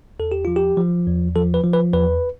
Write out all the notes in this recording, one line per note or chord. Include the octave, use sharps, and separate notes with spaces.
E2 A4
G4
F3 F4
G4
F3
E2
F3 A4
B4
F3
B4
E2 B4